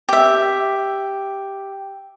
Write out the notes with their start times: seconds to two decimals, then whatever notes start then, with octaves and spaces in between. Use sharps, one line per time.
0.09 G4 E5